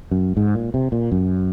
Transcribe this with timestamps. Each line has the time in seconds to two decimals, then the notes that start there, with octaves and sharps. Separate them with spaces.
0.11 F#2
0.37 G#2
0.55 A#2
0.74 C3
0.92 A#2
1.12 F#2